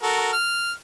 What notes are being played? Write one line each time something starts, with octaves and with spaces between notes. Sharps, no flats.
F#4 A4 A#4
F6